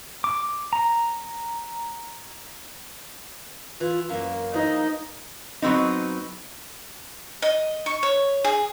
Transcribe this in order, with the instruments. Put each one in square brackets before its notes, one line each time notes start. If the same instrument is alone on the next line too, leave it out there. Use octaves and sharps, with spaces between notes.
[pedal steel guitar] D6
A#5
[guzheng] E3 [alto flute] F4
[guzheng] F#2 A#3 [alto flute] F5
[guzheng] E3 G#4 C5 [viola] D#4
[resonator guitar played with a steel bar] F#3 B3 C4 D#4
[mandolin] D#5
C#6
C#5
G#4